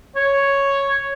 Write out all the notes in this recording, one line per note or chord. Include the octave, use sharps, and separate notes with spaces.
C#5